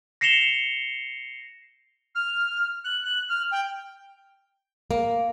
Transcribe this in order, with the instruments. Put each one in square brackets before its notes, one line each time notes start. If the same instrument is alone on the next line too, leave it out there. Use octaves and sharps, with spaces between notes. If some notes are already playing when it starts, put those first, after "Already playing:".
[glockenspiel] A#6 C7 C#7 E7 F7 G7
[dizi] F6
F#6
F#6
F6
G5
[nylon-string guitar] A#3